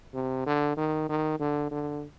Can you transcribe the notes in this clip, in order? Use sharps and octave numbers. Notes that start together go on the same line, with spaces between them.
C3
D3
D#3
D#3
D3
D3